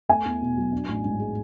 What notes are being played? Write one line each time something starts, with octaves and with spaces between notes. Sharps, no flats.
A3 G#5
E2
B2
F#3
D4
A1
G#2
G#3